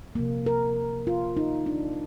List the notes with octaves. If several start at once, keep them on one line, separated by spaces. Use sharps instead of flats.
C3 F3 A#3
A#4
F4
D#4
D4